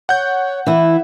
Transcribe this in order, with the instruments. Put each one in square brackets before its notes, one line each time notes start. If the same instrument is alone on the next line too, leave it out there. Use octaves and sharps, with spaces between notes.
[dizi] C#5 [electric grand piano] F#5 G6
[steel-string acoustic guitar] E3 E4 [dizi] E5